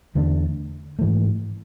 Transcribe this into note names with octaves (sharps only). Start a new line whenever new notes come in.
E2 D3 A3 D4
G#2 E3 A3